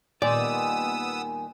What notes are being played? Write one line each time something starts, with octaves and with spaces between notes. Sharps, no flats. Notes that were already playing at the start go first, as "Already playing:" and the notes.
A#2 D#3 G3 B3 D5 G#5 D#6 E6